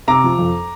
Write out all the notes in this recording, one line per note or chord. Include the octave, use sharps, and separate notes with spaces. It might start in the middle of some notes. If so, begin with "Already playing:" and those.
C3 A#5 D6
F3
F2